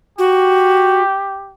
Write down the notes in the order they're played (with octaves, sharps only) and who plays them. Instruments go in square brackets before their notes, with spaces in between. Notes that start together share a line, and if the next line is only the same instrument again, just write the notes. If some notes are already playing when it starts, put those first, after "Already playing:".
[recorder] F#4 [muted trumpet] G4